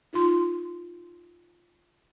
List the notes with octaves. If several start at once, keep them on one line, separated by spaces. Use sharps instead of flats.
D#4 F4 C6